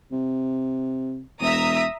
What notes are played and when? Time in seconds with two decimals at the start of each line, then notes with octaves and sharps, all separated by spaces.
0.12 C3
1.41 E1 E5 A#5 D#6